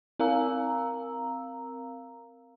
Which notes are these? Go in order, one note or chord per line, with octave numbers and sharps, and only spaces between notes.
C4 A#4 F5 A#5 E6